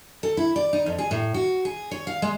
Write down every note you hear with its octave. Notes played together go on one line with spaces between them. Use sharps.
A4
E4
D5
D#4
F2
G#4
A2
F#4
G#4
C#5
F5
G#3